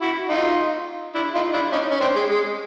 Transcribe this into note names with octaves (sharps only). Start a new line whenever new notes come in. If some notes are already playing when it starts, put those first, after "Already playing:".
E4 F#4
D#4 F4
D4 E4
D#4 F4
D4 E4
C#4 D#4
C#4
C4 D4
G#3
G#3